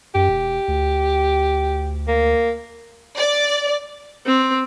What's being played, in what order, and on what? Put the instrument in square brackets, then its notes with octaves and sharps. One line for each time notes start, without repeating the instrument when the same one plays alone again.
[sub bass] F#2 [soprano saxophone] G4
[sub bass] E1
D2
[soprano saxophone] A#3
[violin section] D5
[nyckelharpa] C4